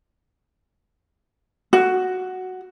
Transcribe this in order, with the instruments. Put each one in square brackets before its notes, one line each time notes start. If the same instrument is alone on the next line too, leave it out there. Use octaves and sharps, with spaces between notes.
[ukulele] F#4